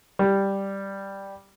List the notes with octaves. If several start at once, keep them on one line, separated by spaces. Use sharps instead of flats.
G3